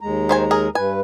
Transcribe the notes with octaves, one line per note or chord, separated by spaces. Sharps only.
D#2 G#3 A#5
D#3 C5 G#5
G#4 A#4
G2 B4 G#5